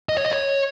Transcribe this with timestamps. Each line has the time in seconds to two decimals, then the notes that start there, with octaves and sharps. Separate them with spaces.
0.09 D#5
0.17 C#5
0.24 D#5
0.32 C#5